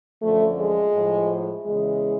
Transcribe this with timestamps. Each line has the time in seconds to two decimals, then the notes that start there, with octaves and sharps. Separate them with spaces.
0.22 F#2 D3 F3 A3
0.58 G#3
0.94 A2 F3
1.65 E2 C#3 E3 G#3